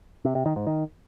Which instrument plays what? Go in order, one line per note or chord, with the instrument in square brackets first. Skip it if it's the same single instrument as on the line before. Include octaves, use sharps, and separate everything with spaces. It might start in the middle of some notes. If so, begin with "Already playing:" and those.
[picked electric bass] C3
C3
D#3
G#2
D#3